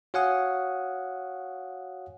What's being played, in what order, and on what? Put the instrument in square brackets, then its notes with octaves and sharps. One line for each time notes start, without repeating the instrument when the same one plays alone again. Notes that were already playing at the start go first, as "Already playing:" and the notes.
[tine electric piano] F#4 C#5 F5 F#5 G#5 D#6